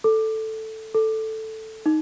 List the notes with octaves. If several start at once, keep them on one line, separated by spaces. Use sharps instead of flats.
A4
A4
D#4